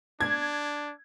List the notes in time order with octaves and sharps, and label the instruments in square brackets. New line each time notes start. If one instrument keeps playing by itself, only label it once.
[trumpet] D4 [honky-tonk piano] G#6